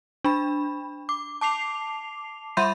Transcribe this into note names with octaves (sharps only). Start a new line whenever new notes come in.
D4 B5
D6
A5 D6 C7 F7
G3 E5 B5 C6 G6 D#7